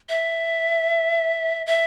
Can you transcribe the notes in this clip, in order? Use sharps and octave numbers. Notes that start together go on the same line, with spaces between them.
E5
E5